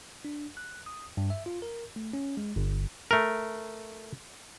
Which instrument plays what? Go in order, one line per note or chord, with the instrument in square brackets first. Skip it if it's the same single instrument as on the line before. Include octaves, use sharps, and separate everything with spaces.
[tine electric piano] D4
F#6
D#6
G2
E5
F4
A#4
A3
C#4
G#3
G1
[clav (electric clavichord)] A3 A#4